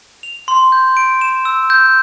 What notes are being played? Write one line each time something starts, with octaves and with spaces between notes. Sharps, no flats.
F7
C6
G6
D7
E7
E6
G6